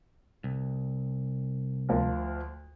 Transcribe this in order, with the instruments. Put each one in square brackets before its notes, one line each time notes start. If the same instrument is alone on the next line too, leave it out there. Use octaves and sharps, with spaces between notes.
[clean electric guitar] C2
[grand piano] D2 F3 A#4